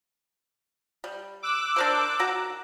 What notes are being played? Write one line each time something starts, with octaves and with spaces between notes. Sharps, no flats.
G3
D6 E6 F#6
D4 A#4 C5
D#3 F#4 A#5